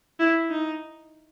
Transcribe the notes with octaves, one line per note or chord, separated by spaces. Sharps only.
E4
D#4